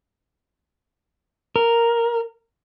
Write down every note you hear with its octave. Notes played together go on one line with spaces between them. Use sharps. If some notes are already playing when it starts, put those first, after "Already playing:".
A#4